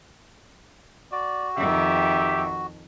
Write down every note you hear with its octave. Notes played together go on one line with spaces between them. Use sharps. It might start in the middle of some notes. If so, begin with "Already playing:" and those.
F#4 D5
F2 D#3 G4 E5